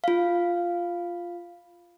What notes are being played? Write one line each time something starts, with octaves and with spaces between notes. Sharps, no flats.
F4 F5